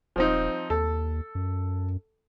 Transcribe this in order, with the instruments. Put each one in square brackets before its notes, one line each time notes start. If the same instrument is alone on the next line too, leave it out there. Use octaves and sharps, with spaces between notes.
[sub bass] D#1 [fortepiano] F3 C4 D#4
[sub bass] D#2 [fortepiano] A4
[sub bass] F#2